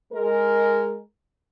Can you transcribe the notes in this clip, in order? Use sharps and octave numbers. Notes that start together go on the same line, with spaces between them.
G#3 A#4